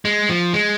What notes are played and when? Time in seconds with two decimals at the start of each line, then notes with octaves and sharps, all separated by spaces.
0.05 G#3
0.29 F3
0.53 G#3